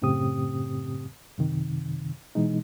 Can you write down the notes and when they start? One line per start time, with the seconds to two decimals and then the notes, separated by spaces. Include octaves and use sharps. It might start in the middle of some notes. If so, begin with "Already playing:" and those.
0.02 F#2 A2 C#3 C4 G4 D#6
1.38 F#2 C3 D#3
2.35 B2 E3 G#3 D#4